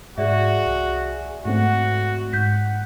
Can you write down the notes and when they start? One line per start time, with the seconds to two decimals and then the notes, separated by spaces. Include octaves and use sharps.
0.18 G#2 F#4 G#4 D5 E5
0.66 C2
1.45 G#2 A3 C4 F#4 F#5
2.33 G#2 G6 B6